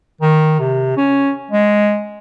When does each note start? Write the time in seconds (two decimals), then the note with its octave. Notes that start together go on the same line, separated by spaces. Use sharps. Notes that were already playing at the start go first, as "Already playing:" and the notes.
0.21 D#3
0.60 C3
0.97 C#4
1.51 G#3